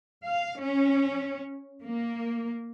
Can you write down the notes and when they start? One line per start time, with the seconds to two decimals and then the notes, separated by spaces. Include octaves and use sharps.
0.25 F5
0.61 C#4
1.83 A#3